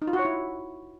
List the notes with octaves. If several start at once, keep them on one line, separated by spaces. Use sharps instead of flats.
D#4
F4
F#4
C#5
E4